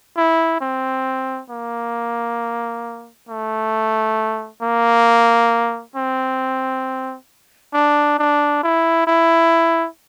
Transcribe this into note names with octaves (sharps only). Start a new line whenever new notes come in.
E4
C4
A#3
A3
A#3
C4
D4
D4
E4
E4